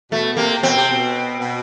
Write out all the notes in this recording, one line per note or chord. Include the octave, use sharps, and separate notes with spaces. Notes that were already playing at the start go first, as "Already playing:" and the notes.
B2 A3
C3 A#3
B2 C4
C3
B2
B2